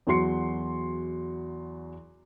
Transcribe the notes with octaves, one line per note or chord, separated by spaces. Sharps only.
E2 F#3 F#4 C6 C7 C#7